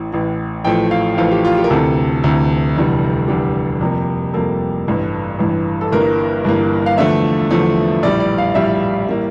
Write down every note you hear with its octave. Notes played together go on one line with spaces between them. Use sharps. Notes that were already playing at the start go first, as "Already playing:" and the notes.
Already playing: A1 A2 E3
A1 A2 E3
A1 A2 F3 A3 G5
F5
A1 A2 F3 A3 F5
G4
F4
G4
A#4
D2 C3 E3 A4
D2 C3 E3
F1 E2 D3 G3
F1 E2 D3 G3 G4
F2 C3 G3 A#3
F2 C3 G3 A#3 A4
A1 G2 E3
A1 G2 E3
A4
G1 G2 E3 A#3 A#4
G1 G2 E3 A#3
F5
E2 D3 F3 A3 E5
E2 D3 F3 A3
A#1 A2 E3 G3 D5
D5
F5
A#1 A2 E3 G3 E5
A2 E3 G3 A#3